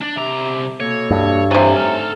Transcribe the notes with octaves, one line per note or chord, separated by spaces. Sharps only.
D4 D5
C2 C3 E5 A#5 D6
B2 A#3 A4 C#5
G2
C3 E3 F#3 E4 A4 G#5
G#2 A3 F6